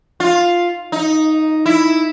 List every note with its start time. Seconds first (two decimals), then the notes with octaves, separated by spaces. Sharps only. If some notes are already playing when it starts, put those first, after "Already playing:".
0.20 F4
0.92 D#4
1.66 E4